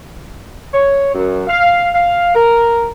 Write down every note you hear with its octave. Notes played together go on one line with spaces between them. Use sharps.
C#5
F#2
F5
F5
A#4